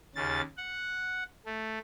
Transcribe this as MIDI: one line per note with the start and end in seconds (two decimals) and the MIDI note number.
0.15 0.41 39
0.15 0.41 49
0.15 0.41 93
0.57 1.23 78
1.46 1.79 57